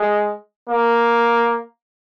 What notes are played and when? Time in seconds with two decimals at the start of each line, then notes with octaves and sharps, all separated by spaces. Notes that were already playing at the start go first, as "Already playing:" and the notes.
Already playing: G#3
0.70 A#3